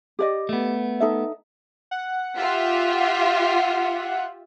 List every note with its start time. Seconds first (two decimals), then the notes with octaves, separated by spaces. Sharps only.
0.19 G4 D5 D#5
0.49 A3 B3
1.00 D#4 A4 E5
1.91 F#5
2.38 F4 G4 E5